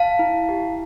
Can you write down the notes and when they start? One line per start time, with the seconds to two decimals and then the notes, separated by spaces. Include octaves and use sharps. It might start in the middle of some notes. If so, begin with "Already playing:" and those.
Already playing: F5 A5
0.19 E4
0.49 G4